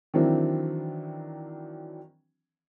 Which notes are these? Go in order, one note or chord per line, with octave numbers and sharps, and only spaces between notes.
D#3 E3 F#3 C4 D4 E4